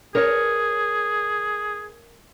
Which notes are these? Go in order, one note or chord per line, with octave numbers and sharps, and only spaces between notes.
G#4 A#4 C#5